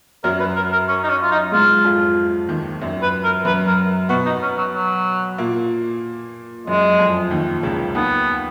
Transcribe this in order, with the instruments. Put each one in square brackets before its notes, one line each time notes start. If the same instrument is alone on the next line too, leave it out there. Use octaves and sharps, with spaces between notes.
[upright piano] F#2 F#3 [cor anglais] A#4
[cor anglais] B4
A#4
A#4
C#4
D#4
C#4
F4
D#4
[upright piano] G#2 G#3 [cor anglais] F4
[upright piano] F2 F3
D#2 D#3
F#2 F#3
[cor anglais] B4
A#4
[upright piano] F#2 F#3 [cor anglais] B4
[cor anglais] A#4
[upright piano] B2 B3 [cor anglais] F#4
[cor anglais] D#4
C#4
F#3
F#3
[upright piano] A#2 A#3
[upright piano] F#2 F#3 [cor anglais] G#3
[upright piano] F2 F3
D#2 D#3
C#2 C#3
[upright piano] D#2 D#3 [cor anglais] B3